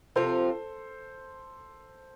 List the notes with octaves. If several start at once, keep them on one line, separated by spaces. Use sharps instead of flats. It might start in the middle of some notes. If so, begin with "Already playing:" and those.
C3 F3 C4 F4 A4 C5